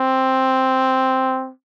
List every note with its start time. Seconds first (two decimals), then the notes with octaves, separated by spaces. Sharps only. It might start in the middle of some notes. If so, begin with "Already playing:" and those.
Already playing: C4